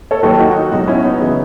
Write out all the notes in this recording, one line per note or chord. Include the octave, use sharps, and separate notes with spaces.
A4 C#5
D#2 D#3 F#3 F#4 A4
D#4 F#4
C#2 B2 F#3 D#4 F#4
C#4 E4
B3 D#4
C#3 E3